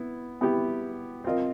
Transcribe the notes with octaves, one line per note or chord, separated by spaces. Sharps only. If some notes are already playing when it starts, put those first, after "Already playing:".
Already playing: B3 E4
B3 E4 G4
C4 F4 A#4 D#5